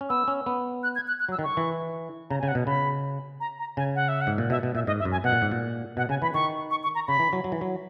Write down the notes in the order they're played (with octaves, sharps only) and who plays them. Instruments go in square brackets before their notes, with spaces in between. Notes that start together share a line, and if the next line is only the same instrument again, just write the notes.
[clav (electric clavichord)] C#4
[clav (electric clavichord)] B3 [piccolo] E6
[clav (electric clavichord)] C#4
B3
[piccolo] F#6
G#6
F#6
F#6
[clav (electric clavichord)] F#3
[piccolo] E6
[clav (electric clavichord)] D#3
[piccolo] C#6
[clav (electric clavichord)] E3
[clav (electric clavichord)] C#3 [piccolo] A#5
[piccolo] G#5
[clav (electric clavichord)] C#3
[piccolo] F#5
[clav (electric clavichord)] B2
[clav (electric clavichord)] C#3 [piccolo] B5
[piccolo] A#5
A#5
[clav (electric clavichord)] C#3 [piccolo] G#5
[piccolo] F#5
E5
F#5
[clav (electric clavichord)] G#2
A#2
[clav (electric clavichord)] B2 [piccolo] E5
[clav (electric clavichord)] B2
[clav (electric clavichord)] A#2 [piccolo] E5
[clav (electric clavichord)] G#2 [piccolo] D#5
[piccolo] E5
[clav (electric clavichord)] F#2
[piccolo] G#5
[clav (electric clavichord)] B2 [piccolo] F#5
[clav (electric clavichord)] A#2
G#2
A#2
[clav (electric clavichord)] B2 [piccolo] F#5
[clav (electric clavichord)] C#3 [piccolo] G#5
[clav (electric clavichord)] E3 [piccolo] B5
[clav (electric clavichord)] D#3 [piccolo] C#6
[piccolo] C#6
C#6
A#5
[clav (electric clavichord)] C#3 [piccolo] B5
[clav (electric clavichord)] E3
F#3
F#3
E3
F#3